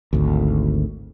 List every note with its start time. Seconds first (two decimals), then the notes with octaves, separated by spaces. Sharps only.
0.13 G#1 D2